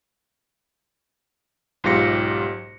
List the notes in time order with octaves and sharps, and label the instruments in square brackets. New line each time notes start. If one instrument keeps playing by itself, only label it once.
[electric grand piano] B1 G#2 F4 G4 A#6 C#7